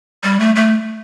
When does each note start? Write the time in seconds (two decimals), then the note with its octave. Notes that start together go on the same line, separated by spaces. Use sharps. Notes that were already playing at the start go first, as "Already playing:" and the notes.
0.23 G3
0.40 A3
0.56 A3